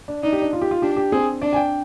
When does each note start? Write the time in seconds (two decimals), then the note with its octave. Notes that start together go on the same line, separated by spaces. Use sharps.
0.08 D4
0.23 D4 D#4
0.33 G4
0.42 D4
0.53 F4
0.61 G4
0.71 F4
0.82 D4 G4
0.97 G4
1.12 C4 G#4
1.42 D4 D5
1.53 G#5
1.56 G5